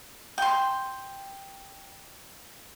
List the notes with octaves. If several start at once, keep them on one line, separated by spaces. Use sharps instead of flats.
G5 C6